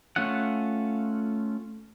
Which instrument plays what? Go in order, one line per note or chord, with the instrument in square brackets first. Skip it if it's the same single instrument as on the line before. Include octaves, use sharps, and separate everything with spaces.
[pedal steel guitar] A3 C#4 F4 F#5